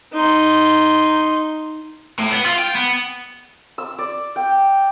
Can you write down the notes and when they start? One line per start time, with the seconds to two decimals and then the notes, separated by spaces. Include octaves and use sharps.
0.13 D#4 C6
2.19 A2
2.33 B3
2.46 F4
2.59 G5
2.75 B3
3.78 E6
3.98 D5
4.36 G5